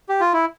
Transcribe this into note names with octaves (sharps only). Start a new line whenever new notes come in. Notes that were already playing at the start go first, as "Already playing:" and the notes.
G4
F4
E4